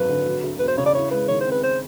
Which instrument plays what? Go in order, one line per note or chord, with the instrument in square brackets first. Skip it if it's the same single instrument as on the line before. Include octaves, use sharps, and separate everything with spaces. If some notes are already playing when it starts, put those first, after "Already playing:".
Already playing: [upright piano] G#1 F#2 F#3 [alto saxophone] B4
[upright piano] D3
F#3
D2
[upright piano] E1 [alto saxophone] B4
[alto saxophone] C5
[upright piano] C#3 [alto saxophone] C#5
[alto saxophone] D5
[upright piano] E4 [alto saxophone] C#5
[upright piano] G#3 [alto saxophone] B4
[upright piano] D#3 [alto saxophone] C#5
[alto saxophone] C5
[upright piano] C4
[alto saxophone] B4
C5